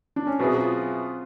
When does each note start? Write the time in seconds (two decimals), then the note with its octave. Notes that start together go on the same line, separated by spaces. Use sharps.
0.16 D4
0.27 C#4
0.39 B2 F#3 B3 C4 E4 G#4
0.58 F4